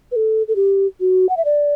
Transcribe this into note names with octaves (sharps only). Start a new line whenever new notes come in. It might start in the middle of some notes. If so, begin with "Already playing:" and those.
B4
A4
A4
G4
F#4
F#5
E5
D5